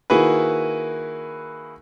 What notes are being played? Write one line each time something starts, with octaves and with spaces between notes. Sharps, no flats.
D#3 A#3 E4 F#4 G#4 B4